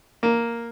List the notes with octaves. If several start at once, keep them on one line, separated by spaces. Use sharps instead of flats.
A#3